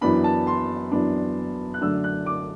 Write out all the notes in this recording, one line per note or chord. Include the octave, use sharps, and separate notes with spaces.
F#2 E3 B3 D4 B5
A5
C6
F#2 E3 B3 D4
F#6
F#2 D3 F#3 A3 D4 E6
F#6
D6